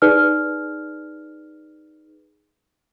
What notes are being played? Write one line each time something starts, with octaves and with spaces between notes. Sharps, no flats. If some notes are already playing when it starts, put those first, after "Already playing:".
D#4 G#4 B4 D5 F6